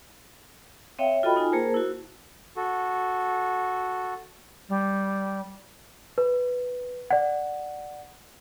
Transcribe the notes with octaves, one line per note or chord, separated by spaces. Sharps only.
C4 C#5 E5 F5 G5
F4 F#4 A4 D#5 G5 B5
D#4 F4 G#5
A#3 G#4 A#4 C5 A5
E4 F#4
F#4 A4
G3
B4
D5 F#5